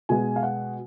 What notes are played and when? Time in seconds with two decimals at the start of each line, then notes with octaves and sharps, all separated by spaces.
0.09 B2 G#3 G#5
0.36 F5
0.43 F#5